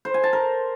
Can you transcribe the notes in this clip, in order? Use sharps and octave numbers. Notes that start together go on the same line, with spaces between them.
C5
G#5
A5
A#4